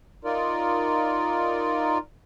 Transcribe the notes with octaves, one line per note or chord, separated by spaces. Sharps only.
D#4 F4 A#4 D5